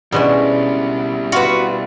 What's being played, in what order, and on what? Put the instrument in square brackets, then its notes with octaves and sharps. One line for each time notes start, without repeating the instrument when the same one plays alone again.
[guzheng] B2 B3 C#4 [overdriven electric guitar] G3 E4 [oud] G#3 D4 C5
[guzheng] F4 [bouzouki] F#4 B4